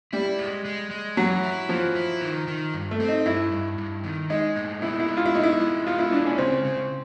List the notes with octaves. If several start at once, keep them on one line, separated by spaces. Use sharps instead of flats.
G3 E4
G#3
G#3
G#3
E3 F#3
E4
E3 F3
E4
D#3
D#3
G2
A3
C4
D#4
G2 E4
G2
G2
D#3
G#3 D#4
A2
B3 E4
E4
G#3
F4
E4
B3 D#4
E4
G#3
B3 F4
E4
G#3 D4
C#4
C#3 C4
C#3